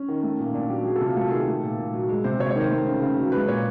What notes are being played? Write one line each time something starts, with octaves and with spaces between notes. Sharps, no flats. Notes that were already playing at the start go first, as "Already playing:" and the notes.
Already playing: C#4
D#3
A3
A#2
A#2 D4
F#3 G4
F#3 G#4
A4
C3
F4
A3 A4
G#4
D#3 A4
A3
A#2
A#2
F#3
G#3
C3 C5
C3 C#5
C#5
D#3
C5
A3
C#3
C#3
F#3
G#3 B4
A#2 C#5